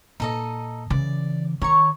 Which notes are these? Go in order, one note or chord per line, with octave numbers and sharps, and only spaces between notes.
A#2 D#4 A4 D#5
C#3 E3 D5
D#3 C#5 A#5 C#6